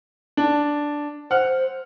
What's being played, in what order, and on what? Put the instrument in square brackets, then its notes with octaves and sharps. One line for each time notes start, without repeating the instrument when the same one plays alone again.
[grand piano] D4
[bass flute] C5 [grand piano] F#5 F6